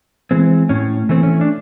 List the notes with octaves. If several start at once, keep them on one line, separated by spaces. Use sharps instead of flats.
E3 G#3 C4
A2 C#4
E3 A3 C4
C#4
D4